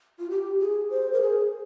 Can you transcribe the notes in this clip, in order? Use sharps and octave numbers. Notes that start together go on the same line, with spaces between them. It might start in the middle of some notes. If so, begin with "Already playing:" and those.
F4
G4
G#4
C5
A#4
G#4